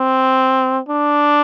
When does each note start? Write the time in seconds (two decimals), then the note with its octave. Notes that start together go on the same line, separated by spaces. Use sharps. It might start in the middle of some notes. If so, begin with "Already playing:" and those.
Already playing: C4
0.89 D4